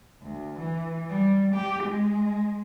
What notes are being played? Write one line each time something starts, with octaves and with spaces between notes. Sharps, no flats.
D2
E3
G3
G4
G#3